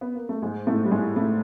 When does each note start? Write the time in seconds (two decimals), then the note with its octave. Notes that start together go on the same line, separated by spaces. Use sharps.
0.01 B3
0.15 A#3
0.29 A3
0.42 G#2 G#3
0.67 A2 A3
0.85 G3
0.91 G#2 G#3
1.16 A2 A3